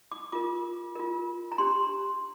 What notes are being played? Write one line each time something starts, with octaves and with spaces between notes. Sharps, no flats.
D6
F4 A#4 D6
F4 A#4
A#5
D4 G4 C5 C6